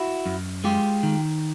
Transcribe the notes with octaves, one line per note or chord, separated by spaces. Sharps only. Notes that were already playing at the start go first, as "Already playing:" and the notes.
Already playing: E4 F#4
F#2
G#3 F4 G4
D#3